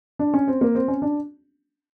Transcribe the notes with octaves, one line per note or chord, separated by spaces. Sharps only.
D4
C#4
C4
A#3
C4
C#4
D4